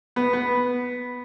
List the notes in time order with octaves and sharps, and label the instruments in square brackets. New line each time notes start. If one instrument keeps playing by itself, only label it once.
[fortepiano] B3
B3